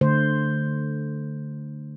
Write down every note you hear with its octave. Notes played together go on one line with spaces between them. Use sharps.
D3 A3 C5